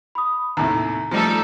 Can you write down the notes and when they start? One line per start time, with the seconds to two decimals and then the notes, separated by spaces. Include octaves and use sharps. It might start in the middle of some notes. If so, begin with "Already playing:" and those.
0.15 B5 D#6
0.57 D#2 A2 C3 A#5
1.11 F3 G3 A3 D#4 A4